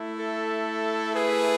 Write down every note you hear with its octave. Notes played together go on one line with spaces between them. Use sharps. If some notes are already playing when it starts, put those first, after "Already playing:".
Already playing: A3 E4
A4
G#4 B4